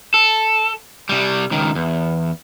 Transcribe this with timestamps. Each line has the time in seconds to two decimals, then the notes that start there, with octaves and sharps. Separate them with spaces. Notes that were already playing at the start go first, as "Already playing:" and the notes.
0.14 A4
1.09 C3 G3
1.51 C#2 D#3
1.75 E2